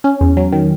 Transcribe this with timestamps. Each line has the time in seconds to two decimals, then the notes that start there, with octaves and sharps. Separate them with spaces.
0.04 C#4
0.21 E2
0.37 F#3
0.52 D#3